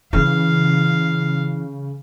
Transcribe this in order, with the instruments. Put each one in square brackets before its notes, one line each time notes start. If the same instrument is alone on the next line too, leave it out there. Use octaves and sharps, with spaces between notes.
[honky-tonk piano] C#3 [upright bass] E3 [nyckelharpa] F5